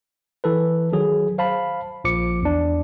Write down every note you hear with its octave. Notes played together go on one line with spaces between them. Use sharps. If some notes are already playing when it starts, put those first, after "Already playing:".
E3 A4 B4
D#3 F#3 G#4
C5 F5 A5 B5
A#1 F3 D6 C#7
E2 D4